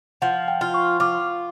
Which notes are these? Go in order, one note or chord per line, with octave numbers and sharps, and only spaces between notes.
F3 F#5
G5
F4
C#6
F4 D6